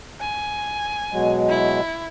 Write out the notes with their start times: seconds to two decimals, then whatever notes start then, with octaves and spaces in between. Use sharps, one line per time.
0.20 G#5
1.13 B2 F#3 G#3
1.49 E4